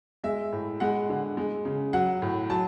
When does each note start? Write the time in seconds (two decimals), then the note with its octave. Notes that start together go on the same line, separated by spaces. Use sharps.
0.23 G#3 E5
0.52 A2
0.80 G#3 F#5
1.09 D3
1.37 G#3
1.65 C#3
1.93 F#3 F#5
2.22 A2
2.50 F#3 A5